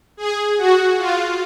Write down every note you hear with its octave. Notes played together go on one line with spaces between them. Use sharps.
G#4
F#4
F4